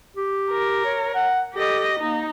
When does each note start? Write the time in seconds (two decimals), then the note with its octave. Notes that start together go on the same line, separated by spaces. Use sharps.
0.16 G4
0.50 A#4
0.85 C#5
1.15 F#5
1.55 G4 A4 D#5
2.00 A#3 D#4